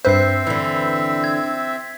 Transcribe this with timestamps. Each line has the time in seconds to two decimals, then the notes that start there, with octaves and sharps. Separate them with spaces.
0.05 G2 C4 B4 C5 E5 G6 C7
0.47 D3 E3
1.24 G#6